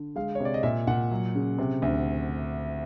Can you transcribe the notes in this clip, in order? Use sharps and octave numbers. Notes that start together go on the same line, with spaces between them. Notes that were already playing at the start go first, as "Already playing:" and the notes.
Already playing: D3
G#3 F5
C#5
C3 D5
D#5
A#2 E5
A#2 F#5
F#3
C#3
C3
D2